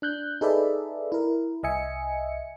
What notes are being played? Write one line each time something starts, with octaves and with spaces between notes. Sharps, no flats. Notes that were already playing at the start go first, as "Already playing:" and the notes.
D4 F#6 G6
D#4 G#4 A4 B4 D5 E5
E4 A#4
C2 D#5 E5 G#5 C#7